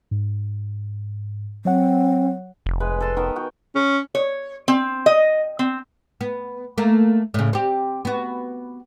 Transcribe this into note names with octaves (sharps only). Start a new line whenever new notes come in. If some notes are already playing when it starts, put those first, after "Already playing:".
G#2
F#3 C4 C#5 F#5
F1
G#3 B4
A4 A5 C6
D#3 B3 A#4
F#4 G5
C#4
C#5
C4
D#5
C4
B3
A3 A#3
A2 C#3
C4 G4
B3 F#4